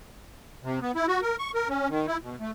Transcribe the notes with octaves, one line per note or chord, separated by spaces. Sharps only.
C3
B3
E4
F#4
A#4
C#6
A#4
C#4
D#3
E4
B2
A3